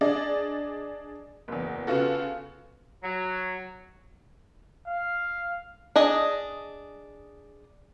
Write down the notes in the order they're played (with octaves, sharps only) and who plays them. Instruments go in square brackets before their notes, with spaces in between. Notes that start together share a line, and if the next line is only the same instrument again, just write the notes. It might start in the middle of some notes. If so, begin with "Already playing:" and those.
[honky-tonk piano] D4 G#4 D5 D#5
F#1 E2
C#3 B3 F4 F#4 A4
[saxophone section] F#3
[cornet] F5
[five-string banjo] D4 G#4 D#5